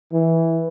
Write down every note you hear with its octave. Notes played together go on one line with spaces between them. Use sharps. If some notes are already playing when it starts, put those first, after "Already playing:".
E3